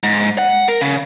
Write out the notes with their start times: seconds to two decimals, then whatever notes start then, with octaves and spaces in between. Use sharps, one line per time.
0.03 G#2
0.38 F#5
0.68 A#4
0.81 C#3